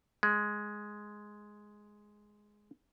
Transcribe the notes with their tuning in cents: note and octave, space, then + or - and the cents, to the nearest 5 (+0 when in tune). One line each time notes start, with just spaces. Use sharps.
G#3 +5